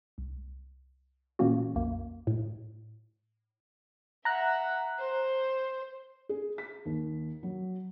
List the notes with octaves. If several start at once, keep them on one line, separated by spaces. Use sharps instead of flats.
C2
A#2 E3 A#3 C#4 F#4
B1 F2 A#3
A2
E5 F#5 A#5 F#6
C5
G#4
B6
D#2
F#3